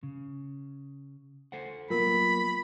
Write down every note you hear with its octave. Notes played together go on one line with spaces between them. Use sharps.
C#3
A4 C5 F#5
F#3 A#3 B3 F4 A#4 B5